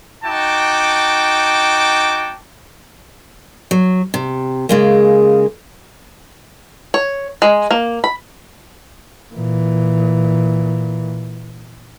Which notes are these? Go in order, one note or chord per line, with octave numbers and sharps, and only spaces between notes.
D#4 F#4 G5 A5 D6
F#3
C3
C#3 G#3 A#3
C#5
G#3
A#3
B5
A#2 E3